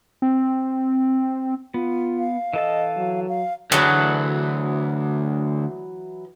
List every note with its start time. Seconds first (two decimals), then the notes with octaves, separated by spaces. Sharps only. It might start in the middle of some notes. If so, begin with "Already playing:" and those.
0.22 C4
1.74 B3 F4
2.19 F5
2.53 E3 A4 D#5 A5
2.97 F#3
3.29 F5
3.72 D2 E3 F#3 G#4 F#5 A5